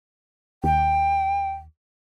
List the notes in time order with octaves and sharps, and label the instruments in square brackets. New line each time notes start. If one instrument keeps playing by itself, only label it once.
[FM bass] D#2 [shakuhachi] G5